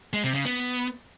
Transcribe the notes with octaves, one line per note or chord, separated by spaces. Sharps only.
G#3
C3
C#3
B3